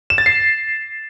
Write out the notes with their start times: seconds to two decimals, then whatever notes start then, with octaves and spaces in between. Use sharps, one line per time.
0.10 E7
0.18 A6
0.26 C7